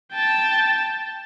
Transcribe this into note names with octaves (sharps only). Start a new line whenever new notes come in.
G5 A5